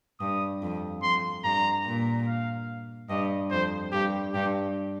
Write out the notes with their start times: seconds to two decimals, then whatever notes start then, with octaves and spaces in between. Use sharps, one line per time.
0.20 G2 D#6
0.62 F2
1.03 F2 C6
1.44 G2 A#5
1.86 A#2
2.27 F5
3.09 G2 D#5
3.51 F2 C5
3.92 G2 G4
4.34 G2 G4